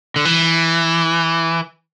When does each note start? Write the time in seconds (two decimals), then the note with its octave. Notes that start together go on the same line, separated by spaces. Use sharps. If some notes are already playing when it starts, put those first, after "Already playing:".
0.16 D3
0.25 E3